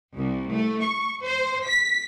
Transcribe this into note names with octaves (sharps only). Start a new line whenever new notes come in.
C2
A3
C#6
C5
B6